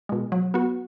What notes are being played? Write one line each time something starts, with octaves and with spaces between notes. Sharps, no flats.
B2 G#3
F#3
B3 F#4